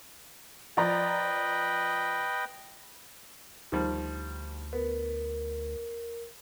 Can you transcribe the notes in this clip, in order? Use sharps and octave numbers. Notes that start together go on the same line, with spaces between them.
F3 B4 D5 D#5 G5 A#5
D2 D#3 F3 G3
B3 A#4